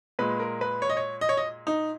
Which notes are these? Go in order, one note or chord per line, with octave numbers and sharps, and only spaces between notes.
A#2 G#3 B4
A#4
B4
C#5
D#5
C#5
D#5
C#5
D#5
D#4